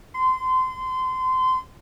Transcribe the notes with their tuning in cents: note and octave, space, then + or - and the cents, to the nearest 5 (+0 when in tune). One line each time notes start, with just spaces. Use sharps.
C6 -25